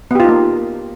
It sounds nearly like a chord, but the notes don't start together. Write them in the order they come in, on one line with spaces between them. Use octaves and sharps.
B3 G4 F4 D#4 A#3